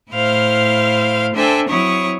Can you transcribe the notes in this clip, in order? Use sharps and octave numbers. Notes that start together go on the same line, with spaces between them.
A2 E4 C5 F5 F6
D4 A4 C5 E5 G5 G#5
F#3 C4 E4 C#5 C#6 D#6